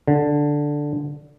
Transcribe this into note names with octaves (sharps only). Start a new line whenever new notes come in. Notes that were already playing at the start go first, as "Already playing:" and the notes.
D3